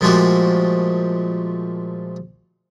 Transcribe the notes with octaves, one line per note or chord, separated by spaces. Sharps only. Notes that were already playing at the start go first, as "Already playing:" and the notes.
A#2 F3 G#3 A3 F#4 G4